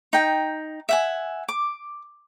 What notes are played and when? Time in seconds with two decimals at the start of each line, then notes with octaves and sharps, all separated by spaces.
0.13 D#4 G5
0.89 E5 F#5 G#5
1.48 D6